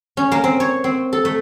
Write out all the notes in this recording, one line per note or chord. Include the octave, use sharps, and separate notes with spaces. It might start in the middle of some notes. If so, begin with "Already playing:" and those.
C#4
A#3
C4
C#5
C4
A4
A3